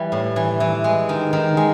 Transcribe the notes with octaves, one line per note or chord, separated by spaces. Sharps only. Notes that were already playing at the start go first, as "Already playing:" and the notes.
Already playing: E3 G3
A2
E3
E3
G#3
D#3
D#3
G#3